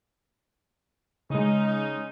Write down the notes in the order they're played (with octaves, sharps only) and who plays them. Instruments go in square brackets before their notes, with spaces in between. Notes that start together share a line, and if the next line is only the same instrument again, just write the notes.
[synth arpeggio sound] C#3 G#3 [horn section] C#4 D#4